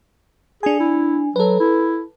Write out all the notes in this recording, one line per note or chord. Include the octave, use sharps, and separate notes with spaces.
D4 G#4 G#5
E4
F#3 A4 B4
E4